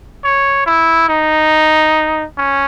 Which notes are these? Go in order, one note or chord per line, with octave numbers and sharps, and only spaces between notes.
C#5
E4
D#4
C#4